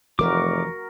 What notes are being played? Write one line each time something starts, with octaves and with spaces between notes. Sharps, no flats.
F1 E3 F3 A3 F#4 A#4 D6